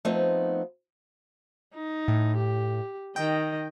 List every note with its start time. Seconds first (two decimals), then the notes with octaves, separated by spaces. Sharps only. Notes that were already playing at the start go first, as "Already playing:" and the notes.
0.05 F3 A3 B3 C4 D#4
1.75 D#4
2.08 A2
2.37 G4
3.16 D#3 D#5 G5